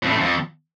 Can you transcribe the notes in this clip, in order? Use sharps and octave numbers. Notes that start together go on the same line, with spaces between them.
F2
A2
F#2
F2